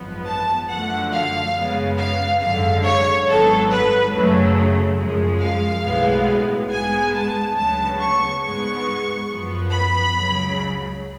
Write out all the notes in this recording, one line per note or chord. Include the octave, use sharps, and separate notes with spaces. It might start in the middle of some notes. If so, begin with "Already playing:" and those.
Already playing: G#1 F#2 F3 B3
A5
F#2 D3 F3 A3 F#5
F5
F#2 C#3 G#3 B3
F5
G#1 F#2 D3 G#3 F5
C#5
G#1 G#2 F#3 B3 A4
B4
F#2 C#3 F#3 A3
F#2 F3 G#3
F5
B1 A2 G#3 B3
G#2 G#3 B3 G#5
A5
D2 C#3 F#3 B3 A5
C#6
G#2 G#3 B3 C#6
F#2 F3 B3
B5
C#2 C#3 F#3